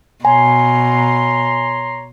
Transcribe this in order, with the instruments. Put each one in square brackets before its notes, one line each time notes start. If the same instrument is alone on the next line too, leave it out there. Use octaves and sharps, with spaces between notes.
[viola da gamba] B2 [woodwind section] C#5 A#5 C6 [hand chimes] G#5